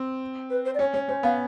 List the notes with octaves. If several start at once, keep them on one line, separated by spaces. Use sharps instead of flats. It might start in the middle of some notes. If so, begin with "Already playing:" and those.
Already playing: C4
B4
C5
D5
C#4 C#5
C#4 C#5
C#4 C5
B3 F5